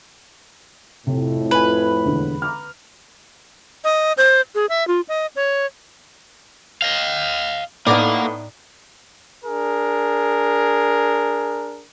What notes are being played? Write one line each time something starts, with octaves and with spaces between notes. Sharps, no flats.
F2 A2 C3
F4 B4 G#5
E1 D3
A#5 D6 F6
D#5
C5
G#4
E5
F4
D#5
C#5
D#5 F5
A2 A#3 B3 D#4 D5
D4 G#4 A#4